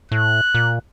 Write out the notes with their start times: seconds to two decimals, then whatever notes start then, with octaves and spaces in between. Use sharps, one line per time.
0.12 A2 F#6
0.55 A#2